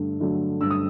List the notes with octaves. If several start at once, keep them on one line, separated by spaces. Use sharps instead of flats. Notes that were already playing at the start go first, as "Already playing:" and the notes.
Already playing: G2 D3 A3
D3 F#3 A3
G2 E6
D#6